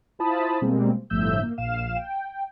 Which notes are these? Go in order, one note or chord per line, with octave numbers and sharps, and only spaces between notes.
E4 F4 C5 A5 B5 D#6
B2 G3 G#3 A#3 C4
G1 A2 F3 E5 E6 G6
A#3
A#1 F5 E7
G5